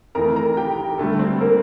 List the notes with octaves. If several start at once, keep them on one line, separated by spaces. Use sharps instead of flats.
F2 E3 A3 A#4 A#5
A#4 A#5
G4 G5
D2 D3 G3 A3 A4
C4 C5
A#3 A#4